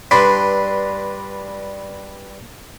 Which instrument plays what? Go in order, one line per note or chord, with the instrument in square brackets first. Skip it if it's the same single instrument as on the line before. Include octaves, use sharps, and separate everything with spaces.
[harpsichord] G2 D4 B4 C6 D6